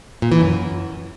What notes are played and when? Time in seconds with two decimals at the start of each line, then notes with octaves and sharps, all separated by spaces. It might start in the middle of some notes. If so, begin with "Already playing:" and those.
0.22 A#2
0.32 E3
0.41 F#2